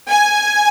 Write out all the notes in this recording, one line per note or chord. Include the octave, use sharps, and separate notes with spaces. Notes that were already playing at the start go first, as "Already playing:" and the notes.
G#5